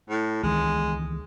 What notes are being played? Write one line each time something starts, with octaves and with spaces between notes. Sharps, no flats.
A2
C#2 D#3 E3 G#3